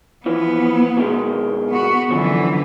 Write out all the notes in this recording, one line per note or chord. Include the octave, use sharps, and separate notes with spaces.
E3 F3 B3
B2 D#3 G#3
B3 F#4
F#2 D3 E3 F3